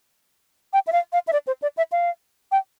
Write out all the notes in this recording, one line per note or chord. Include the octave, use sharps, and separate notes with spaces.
G5
E5
F5
F5
E5
D5
C5
D5
E5
F5
G5